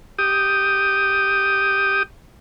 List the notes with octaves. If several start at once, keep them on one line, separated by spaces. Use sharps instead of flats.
G4 D#6